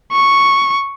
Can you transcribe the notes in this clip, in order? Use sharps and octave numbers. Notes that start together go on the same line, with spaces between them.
C#6